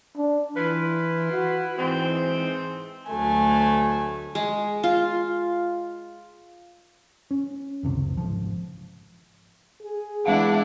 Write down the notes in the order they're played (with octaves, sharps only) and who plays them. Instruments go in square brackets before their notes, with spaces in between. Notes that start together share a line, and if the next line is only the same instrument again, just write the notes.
[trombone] D4
[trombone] E3 [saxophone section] E4 F4 B4
[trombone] F#4
[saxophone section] G#2 C4 [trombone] E3
[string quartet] D2 F#3 A3 G#5
[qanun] G#3
F4
[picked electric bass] C#4
F#1 C#2 C3
G#1 F3
[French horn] G#4
[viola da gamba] E3 D4 E4 [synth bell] G#3 F5 F#5